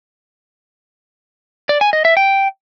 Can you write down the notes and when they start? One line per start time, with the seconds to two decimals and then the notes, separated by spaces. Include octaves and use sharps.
1.69 D5
1.81 G#5
1.93 D#5
2.05 E5
2.17 G5